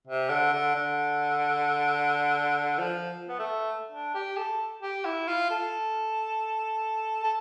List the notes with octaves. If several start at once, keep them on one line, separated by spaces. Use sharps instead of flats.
C3
D3
D3
D3
F3
B3
A3
D4
G4
A4
G4
E4
F4
A4
A4